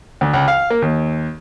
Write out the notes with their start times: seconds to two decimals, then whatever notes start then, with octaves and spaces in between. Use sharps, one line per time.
0.21 D2
0.34 C#2
0.48 F5
0.70 A#3
0.82 D#2